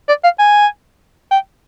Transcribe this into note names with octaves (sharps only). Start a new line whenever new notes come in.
D5
F5
G#5
G5